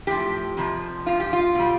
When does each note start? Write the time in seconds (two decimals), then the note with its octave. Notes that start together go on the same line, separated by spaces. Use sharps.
0.07 A2 F3 G4
0.57 F2 C3 F3
1.06 G2 F3 F4
1.20 G4
1.33 F4
1.55 B2 G3